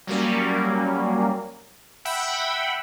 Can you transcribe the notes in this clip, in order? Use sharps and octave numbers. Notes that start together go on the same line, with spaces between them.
F#3 G3 A#3 C#4
E5 F#5 G5 B5 E6